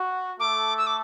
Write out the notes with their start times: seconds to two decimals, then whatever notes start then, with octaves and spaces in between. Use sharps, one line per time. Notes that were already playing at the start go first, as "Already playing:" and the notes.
Already playing: F#4
0.40 A3 A4 D6
0.78 E6
0.87 D6